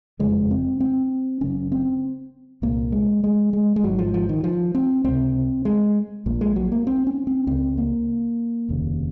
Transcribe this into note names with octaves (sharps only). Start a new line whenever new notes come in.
F#1 F2 C#3 G#3
C4
C4
F#1 F#2 C#3 C#4
C4
C2 A#2 A#3
G#3
G#3
G#3
G#3
G#1 G#2 F#3
F3
F3
D#3
F3
C4
C#2 C3 C4
G#3
A#1 A#2
G#3
F#3
A#3
C4
C#4
C4
C#2 C#3 C4
A#3
F1 D#2 C#3